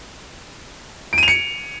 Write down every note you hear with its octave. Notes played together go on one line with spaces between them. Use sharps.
D7
D#7
F7
C#7